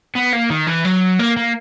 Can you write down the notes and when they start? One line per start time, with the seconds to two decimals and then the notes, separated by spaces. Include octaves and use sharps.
0.16 B3
0.33 A#3
0.50 D#3
0.67 E3
0.85 F#3
1.19 A#3
1.37 A#3